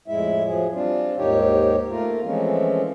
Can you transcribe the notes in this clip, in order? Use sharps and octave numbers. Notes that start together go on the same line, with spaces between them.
F2 A2 G#3 E4 E5
F3 F#3 G#4
G3 C4 D4 F4
D#2 G#2 D#3 D#4 G4 C#5
A3 A#3 F4 A#4
E3 F3 G#3 A3 C4 C#4